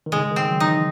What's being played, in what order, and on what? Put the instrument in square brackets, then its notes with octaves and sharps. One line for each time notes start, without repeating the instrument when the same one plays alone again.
[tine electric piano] D#3
[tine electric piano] C#3 [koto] G#3
[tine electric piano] D#3
[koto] C4
[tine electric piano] F#3
[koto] D#4
[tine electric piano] E3